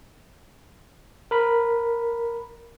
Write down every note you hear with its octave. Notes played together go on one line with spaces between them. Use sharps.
A#4 B5